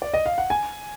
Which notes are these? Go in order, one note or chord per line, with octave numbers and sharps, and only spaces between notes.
D5
D#5
F5
F#5
G#5